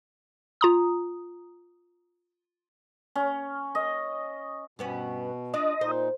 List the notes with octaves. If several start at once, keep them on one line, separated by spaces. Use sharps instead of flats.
F4 A#5 D#6
C#4
D#5
G2 B2 B3 C#4
D4 F4 D#5
A#2 D#4 C5